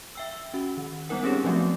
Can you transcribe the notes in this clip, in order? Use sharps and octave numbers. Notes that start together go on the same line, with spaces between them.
E5 G5 E6
C#4 F#4
D#3
G3 B3 D#4 A#4 F#5
C4 C#4 G4 G#4 C#5
F3 F#3 A3 B3 C4 F#4